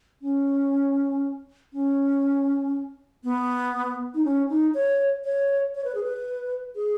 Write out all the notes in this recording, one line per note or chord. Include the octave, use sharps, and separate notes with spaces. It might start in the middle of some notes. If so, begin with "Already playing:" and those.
C#4
C#4
B3
D#4
C#4
D#4
C#5
C#5
C#5
B4
G#4
B4
G#4